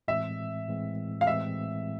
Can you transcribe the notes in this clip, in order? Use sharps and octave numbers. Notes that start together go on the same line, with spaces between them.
A2 E3 G#3 C4 E5
A2 E3 G#3 C4
F5
A2 E3 G#3 C4 E5